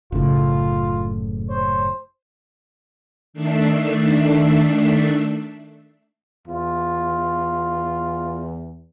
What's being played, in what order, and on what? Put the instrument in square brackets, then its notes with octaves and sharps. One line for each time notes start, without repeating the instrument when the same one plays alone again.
[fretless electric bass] F#1 A2 [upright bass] C#3 [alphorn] F4
[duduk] C5 [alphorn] C#5
[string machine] D#3 A3 D4 E5 C7
[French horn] E2 [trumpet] F4